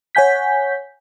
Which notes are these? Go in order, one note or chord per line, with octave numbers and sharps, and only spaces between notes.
C#5 F#5 G#5 G6 B6